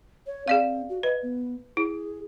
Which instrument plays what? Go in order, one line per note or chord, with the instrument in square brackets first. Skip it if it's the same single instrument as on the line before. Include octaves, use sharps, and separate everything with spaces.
[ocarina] C#5
[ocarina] C4 [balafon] G#4 D5 F5
[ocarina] F#4
[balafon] B4 [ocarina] D#5
[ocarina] B3
[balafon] E4 [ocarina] G#4